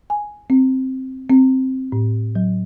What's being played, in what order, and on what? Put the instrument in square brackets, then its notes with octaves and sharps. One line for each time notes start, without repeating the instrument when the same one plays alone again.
[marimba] G#5
C4
C4
A2
F#3